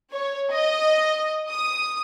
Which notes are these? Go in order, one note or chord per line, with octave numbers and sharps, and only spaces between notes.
C#5
D#5
D#6